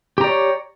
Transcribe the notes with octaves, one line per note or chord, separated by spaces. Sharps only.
G4 C#5 D5 A#5